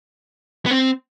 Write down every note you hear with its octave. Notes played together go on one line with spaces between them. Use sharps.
B3
C4